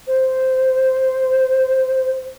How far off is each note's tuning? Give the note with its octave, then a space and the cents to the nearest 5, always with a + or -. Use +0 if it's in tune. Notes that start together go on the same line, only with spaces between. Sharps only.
C5 -5